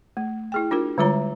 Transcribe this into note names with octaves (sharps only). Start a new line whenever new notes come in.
A3
E4 G#4 G5
D4 F4 F#4 A#4
D3 G3 G#3 F4 C#5 A#5